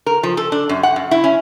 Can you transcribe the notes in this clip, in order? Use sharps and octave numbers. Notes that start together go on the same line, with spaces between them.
A#4
F3
A4
D4
F#2
F#5
F#2
E4
C#4